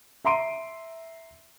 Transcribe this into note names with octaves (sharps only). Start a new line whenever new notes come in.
E5 A#5 C6 D7 D#7